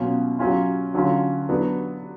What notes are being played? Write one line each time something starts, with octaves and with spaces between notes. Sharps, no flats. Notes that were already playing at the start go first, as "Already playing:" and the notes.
Already playing: B2 F#3 C#4 F4
F#3 C#4 F4
D3 F#3 C#4 F4
F#3 B3 D4